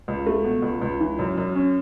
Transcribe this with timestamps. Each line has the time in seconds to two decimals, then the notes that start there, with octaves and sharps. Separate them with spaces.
0.08 C#2
0.27 A3
0.44 B2
0.62 C#2
0.81 C#2
1.00 E3
1.19 F#2
1.37 F#2
1.56 C#4